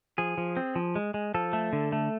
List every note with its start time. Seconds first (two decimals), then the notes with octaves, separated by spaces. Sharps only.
0.18 F3 G#4
0.38 F3
0.57 C4
0.76 F3
0.95 G#3
1.14 G#3
1.34 F3 A4
1.53 A3
1.73 D3
1.92 A3